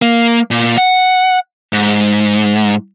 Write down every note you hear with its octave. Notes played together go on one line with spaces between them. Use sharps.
A#3
A#2
F#5
G#2